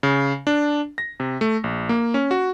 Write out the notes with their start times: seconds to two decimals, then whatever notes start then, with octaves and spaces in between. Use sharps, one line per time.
0.03 C#3
0.47 D4
0.98 A#6
1.20 C3
1.41 A3
1.64 A#1
1.89 A#3
2.14 C#4
2.31 F#4